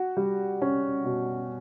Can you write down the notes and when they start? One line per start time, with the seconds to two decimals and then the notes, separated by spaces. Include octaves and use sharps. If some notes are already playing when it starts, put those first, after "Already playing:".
Already playing: F#4
0.17 G3
0.62 C#4
1.05 B2